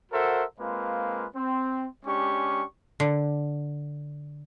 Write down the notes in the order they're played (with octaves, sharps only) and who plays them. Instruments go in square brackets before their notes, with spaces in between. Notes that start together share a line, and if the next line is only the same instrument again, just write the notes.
[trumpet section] F#4 A4 A#4 C5 E5 F#5
G#3 A#3 C4 F4 B4 F5
C4
G#3 C#4 D4 G4 C#6
[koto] D3